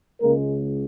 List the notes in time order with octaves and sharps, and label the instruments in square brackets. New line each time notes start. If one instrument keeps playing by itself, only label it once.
[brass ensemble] C#2 C#3 G#3 A#3 A#4